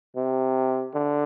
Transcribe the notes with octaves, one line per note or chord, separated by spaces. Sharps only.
C3
D3